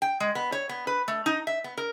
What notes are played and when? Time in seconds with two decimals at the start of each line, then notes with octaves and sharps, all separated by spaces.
0.02 G5
0.20 G#3
0.35 B3
0.52 C#5
0.69 B3
0.87 B4
1.08 A3
1.26 D#4
1.47 E5
1.64 B3
1.77 A#4